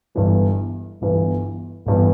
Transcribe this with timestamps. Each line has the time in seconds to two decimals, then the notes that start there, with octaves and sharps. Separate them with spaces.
0.15 G1 G2 E3 B3
1.01 G1 G2 E3 B3
1.86 G1 G2 E3 B3